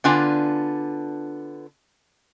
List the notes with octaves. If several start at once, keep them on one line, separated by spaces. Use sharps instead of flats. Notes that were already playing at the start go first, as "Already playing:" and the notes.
D3 B3 D4 F4 G#5